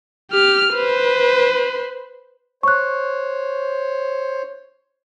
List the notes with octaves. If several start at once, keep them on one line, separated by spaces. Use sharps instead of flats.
G4 F6
B4 C5
C5 C#5 C#6 F#6